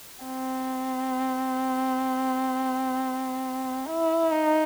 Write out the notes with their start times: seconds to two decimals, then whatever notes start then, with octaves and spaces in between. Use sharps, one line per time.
0.24 C4
3.86 E4
4.32 D#4